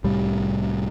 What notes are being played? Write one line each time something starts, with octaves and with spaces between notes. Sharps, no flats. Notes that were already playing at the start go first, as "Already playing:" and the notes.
C2 A2 G3